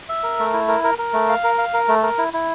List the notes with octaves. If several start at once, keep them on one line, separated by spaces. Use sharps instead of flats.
E5
A#4
A3
E4
A#4
A#4
A#4
A3
F5
A#4
F5
A#4
A3
A#4
E4
E4